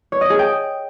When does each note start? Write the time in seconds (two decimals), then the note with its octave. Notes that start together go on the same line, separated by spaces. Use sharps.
0.12 C#5
0.21 D#5
0.30 G#4
0.39 G5